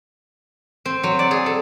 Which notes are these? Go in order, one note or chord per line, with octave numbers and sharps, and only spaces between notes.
C4
F#3
D5
G#4
A4